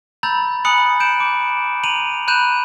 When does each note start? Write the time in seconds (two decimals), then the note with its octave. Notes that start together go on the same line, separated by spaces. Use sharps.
0.23 A#5 B5 E6 G6 A6
0.65 G#5 B5 D#6 F#6 C#7 F#7
1.00 G6 D7 E7
1.20 D6
1.83 A#5 D#7 F7 F#7
2.28 B5 F#6 G6 D#7 E7